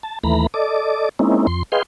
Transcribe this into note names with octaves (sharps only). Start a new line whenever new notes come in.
A5
D#2 E3 A3 A#5 B5
A4 D5 D#5 D6
G#3 A#3 C4 C#4 D#4 E4
F2 C6
G#4 B4 D#5 F5 G5 C6